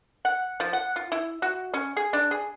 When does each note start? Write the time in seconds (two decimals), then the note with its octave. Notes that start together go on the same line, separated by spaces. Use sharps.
0.25 F#5
0.60 F3
0.73 F#5
0.96 F4
1.12 E4
1.42 F#4
1.74 C#4
1.97 G#4
2.13 D4
2.31 G#4